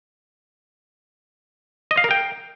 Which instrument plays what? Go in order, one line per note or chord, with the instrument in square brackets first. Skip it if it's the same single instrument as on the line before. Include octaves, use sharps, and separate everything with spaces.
[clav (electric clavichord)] D#5
F5
A#4
G5